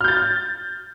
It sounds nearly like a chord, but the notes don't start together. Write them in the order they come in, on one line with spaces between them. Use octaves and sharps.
F6 G6 A6